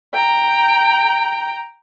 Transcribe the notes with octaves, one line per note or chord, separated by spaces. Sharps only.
G5 A#5